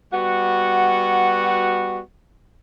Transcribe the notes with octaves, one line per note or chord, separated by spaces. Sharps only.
G3 B3 F#4